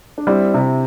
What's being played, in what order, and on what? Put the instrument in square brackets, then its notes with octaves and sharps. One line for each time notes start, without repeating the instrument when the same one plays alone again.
[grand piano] D4
[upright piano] G3 [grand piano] C4 E4
[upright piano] C3